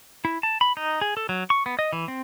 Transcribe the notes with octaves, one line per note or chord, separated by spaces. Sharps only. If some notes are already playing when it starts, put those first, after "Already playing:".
E4
A5
B5
D#4
G#4
A4
F#3
C#6
B3
D#5
E3
C4